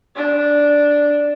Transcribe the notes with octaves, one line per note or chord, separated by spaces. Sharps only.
D4